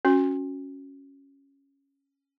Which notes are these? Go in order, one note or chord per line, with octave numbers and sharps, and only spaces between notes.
C#4 F#4